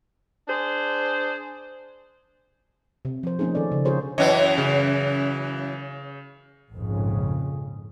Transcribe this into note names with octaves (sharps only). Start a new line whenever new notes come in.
D4 G#4 C5
C3
F3 C5
F3 A3 A#3 C#4 D#4 G#4
D#3 A4 D5
C#3
D4 F4 G#4 A#4 C5 C#5
F#2 E3 C#5 D#5
C#3
A#1 F2 G#2 C#3